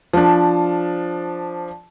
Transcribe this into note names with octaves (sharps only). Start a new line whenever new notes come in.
F3 D4